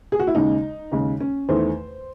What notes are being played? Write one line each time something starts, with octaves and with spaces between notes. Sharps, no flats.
G#4
F#4
E4
D#2 C#3 G#3 D#4
D#2 C#3 G#3
C#4
E2 D#3 A3 C5